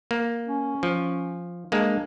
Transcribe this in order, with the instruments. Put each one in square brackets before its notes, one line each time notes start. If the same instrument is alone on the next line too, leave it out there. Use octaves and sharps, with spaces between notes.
[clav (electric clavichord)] A#3
[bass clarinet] C#4
[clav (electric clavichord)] F3
[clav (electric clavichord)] G#3 A#3 [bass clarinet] D4